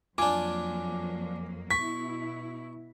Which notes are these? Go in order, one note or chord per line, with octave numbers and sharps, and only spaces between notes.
F2 F#3 A#3 D4 F4 G#5 D6
B2 E4 C#6 B6